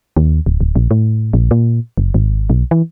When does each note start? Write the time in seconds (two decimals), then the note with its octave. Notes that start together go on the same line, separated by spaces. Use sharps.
0.16 D#2
0.46 D1
0.61 D1
0.76 A#1
0.91 A2
1.33 A#1
1.51 A#2
1.97 F#1
2.14 G#1
2.50 B1
2.71 E3